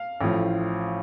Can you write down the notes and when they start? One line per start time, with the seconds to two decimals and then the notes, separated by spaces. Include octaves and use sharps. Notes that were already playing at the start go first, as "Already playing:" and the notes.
Already playing: F5
0.21 A1 A2 F3